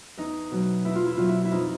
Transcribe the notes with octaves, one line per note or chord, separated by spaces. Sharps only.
E2 D#4
B2 F#3
E2 E4
F4
E4
B2 F#3 F4
E4
E4
F2 D#4 F4